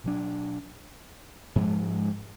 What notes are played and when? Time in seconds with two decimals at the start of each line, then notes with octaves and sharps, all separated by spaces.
0.04 B2 F#3 D4
1.56 G#2 F3 G#3